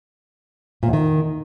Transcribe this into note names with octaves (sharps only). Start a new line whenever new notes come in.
A#2
E2
D#3